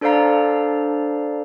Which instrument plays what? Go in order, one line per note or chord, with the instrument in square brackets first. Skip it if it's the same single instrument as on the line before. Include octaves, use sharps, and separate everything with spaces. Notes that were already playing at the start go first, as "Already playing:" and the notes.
[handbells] D4 A4 C5 D5 F5 A#5